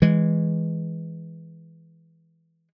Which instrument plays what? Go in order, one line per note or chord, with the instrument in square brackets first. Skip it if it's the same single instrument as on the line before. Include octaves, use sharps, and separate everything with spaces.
[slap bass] E3 G#3